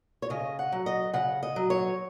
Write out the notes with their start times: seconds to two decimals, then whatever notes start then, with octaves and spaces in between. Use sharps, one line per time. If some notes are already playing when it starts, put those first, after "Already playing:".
0.22 C#5
0.30 C#3 D#5
0.59 F#5
0.72 F#3
0.86 D#5
1.14 C#3 F#5
1.43 D#5
1.56 F#3
1.70 C#5